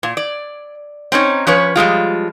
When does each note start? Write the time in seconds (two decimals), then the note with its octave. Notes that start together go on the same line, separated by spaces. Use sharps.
0.03 A#2
0.17 D5
1.12 C4 C#4 D#4 C#5
1.47 F3 C#4 B4 C#5
1.76 F3 G3 G#3 F4